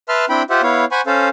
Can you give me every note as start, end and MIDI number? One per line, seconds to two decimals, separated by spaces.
0.09 0.25 71
0.09 0.25 76
0.09 0.25 81
0.09 0.25 84
0.09 0.25 89
0.29 0.43 60
0.29 0.43 62
0.29 0.43 64
0.29 0.43 79
0.29 0.43 83
0.50 0.62 65
0.50 0.62 67
0.50 0.62 72
0.50 0.62 76
0.50 0.62 78
0.63 0.85 59
0.63 0.85 64
0.63 0.85 73
0.63 0.85 77
0.92 1.01 72
0.92 1.01 78
0.92 1.01 80
0.92 1.01 83
0.92 1.01 85
1.07 1.29 61
1.07 1.29 69
1.07 1.29 72
1.07 1.29 77